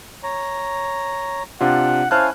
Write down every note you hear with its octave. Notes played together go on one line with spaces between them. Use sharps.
C#5 A#5
C3 D4 F4 F#5
C#4 E4 C5 F5 G#5 A5 F#6